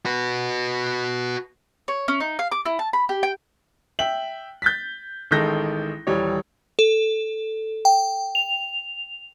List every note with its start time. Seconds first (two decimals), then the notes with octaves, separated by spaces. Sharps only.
0.06 F#4 B4
1.88 C#5
2.08 C#4
2.20 D#4
2.39 F5
2.52 D6
2.65 E4
2.79 A5
2.93 B5
3.09 G4
3.23 G5
3.99 E5 G5 F#7
4.62 G6 A6 B6
5.31 A1 D#3 G#3 A4 G6 A#6
6.07 D#1 E3 G3 C#5
6.79 A4
7.85 G5
8.35 F7